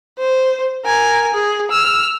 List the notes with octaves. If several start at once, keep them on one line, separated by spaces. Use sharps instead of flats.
C5
A#4 G#5
G#4
E6 F6